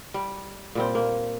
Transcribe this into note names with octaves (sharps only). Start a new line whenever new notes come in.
G3
A#2 G3 C4
A#3